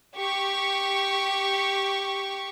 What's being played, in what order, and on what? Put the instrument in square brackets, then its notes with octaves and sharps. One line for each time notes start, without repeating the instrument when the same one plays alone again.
[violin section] G4 C#6